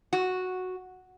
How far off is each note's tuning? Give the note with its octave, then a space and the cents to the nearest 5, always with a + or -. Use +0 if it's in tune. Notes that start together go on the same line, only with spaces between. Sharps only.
F#4 -5